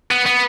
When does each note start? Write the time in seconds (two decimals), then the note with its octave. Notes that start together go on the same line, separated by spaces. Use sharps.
0.11 B3
0.26 B3